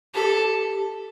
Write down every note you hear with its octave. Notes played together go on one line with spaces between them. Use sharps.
G4 A4